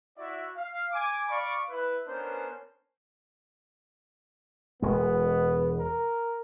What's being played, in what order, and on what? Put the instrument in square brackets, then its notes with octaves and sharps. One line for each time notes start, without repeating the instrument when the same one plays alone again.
[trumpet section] E4 F#4 D5 E5
F5
G#5 D6
D5 F5 B5 C#6 D6
E4 B4
B3 C#4 D4 A#4 C5
[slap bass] E1 G#3 [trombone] B3
[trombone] A#4